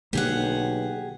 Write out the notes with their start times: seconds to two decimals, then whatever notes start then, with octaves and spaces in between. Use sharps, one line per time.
0.13 B1 D3 A#3 G4 G#4 F#5